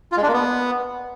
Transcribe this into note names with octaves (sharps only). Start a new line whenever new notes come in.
F4
G#3
D4
A#3
B3